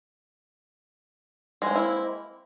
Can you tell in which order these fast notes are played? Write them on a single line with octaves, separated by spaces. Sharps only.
G#3 C4 A#3 E4